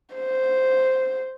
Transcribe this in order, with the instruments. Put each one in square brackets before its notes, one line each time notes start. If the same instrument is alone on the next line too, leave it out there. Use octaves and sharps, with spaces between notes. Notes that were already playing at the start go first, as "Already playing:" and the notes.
[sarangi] C5